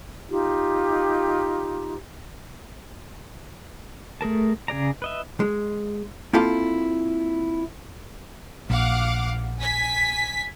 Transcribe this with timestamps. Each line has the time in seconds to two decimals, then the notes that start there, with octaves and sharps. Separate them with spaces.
0.29 D#4 F4 G4
4.21 A3 G#4 A#4 A5
4.68 C#3 G#4 D5 A#5
5.02 B4 D#5 E5
5.40 G#3
6.33 A#3 C4 E4 F4 A4 F5
8.70 A#1 F5 F#5 D6
9.60 G#5 B6